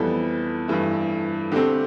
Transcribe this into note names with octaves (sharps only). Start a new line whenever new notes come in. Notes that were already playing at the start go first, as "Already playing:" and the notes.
Already playing: F2 E3 G3 B3 A4
G2 E3 A3
D3 A3 C4 G4